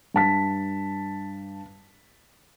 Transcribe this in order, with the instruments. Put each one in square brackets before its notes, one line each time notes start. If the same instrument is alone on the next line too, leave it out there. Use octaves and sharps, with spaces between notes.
[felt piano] G2 A5 B6